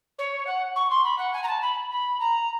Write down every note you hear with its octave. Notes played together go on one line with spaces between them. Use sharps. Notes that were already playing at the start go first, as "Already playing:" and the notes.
C#5
F#5
C#6
C6
B5
F#5
G#5
A#5
A5
B5
B5
A#5